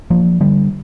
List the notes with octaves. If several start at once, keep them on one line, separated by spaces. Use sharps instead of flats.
F3 A#3
D3 G3